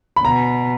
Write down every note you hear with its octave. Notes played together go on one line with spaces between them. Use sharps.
B5
B2 A#5